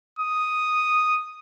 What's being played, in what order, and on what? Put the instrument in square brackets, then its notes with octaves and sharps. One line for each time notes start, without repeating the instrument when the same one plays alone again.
[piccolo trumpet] D#6